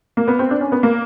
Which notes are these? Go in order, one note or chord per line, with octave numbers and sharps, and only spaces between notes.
A#3
B3
C4
D4
C#4
B3
A#3